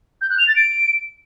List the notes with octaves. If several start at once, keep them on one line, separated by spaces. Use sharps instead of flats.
G6
F#6
F7
A6
D7